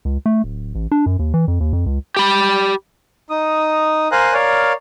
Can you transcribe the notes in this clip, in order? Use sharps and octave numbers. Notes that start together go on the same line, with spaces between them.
C#2
A3
D1
A1
D4
F#2
D#2
E3
F2
D#2
F2
C#2
G4 B5
D#4 D#6
A#4 C5 F5 G#5 A#5 F#6
A#4 C#5 D5 F5